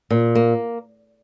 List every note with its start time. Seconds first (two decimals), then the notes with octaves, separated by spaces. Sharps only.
0.10 A#2
0.35 A#3